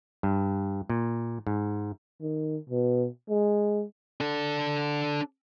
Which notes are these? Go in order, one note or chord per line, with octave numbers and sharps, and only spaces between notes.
G2
A#2
G#2
D#3
B2
G#3
D4 A4